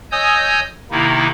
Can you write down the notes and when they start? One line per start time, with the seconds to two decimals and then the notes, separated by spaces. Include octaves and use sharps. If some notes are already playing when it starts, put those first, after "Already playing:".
0.11 C#5 D#5 G#5 D#6 E6 G6
0.91 C3 D#3 A#3 D#4 E4